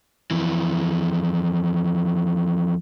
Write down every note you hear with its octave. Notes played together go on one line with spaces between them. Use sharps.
F2 E3